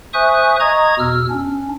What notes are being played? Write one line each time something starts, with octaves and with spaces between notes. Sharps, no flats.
C5 E5 G#5 C#6 D#6 F#6
D#5 A#5 C#6 D#6 G#6
E2 B2 E6 F6
C#4 D4